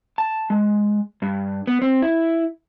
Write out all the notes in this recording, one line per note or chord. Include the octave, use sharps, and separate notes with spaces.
A5
G#3
G2
B3
C4
E4